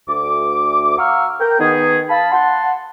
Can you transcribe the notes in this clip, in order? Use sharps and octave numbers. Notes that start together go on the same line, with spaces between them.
D2 D6
F5 F#5 A#5 C#6 E6 F6
A#4 G5
D#3 B3 G#4
F5 A5 B5
F#5 A5 C6